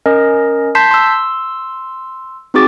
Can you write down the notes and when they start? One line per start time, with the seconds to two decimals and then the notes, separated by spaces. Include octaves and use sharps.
0.06 C#4 A#4 D#5
0.75 A5 C6 G6 B6 C7
0.91 C6 E6
2.54 C4 D#4 F#4 G#4 D6 A6